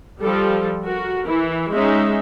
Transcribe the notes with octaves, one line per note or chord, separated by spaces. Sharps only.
F3 G3 A4
F#4 A#4
E3 E4
G#3 C#4 D#4 E5